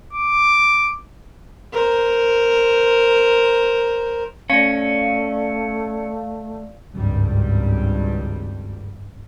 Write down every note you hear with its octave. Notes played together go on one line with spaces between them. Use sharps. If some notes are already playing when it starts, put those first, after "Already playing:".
D6
A#4 C5
A3 C#4 D5 F5
G#1 C#2 G2 G3